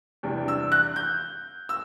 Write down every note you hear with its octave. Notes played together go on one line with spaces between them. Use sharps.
E2 C3 G3 D4
E6
F#6
G6
E6